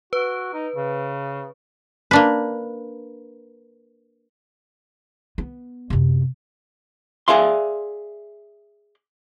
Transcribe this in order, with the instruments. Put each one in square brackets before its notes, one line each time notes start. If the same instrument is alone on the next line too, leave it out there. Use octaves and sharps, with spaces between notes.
[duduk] F#4 [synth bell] B4
[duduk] D#4
C#3
[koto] A#3 D4 B4
[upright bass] B3
F#2 C3
[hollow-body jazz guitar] G#4 D5 E5 F5 C6